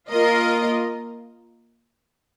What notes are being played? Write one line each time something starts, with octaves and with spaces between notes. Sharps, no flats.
A#3 F4 A#4 D#5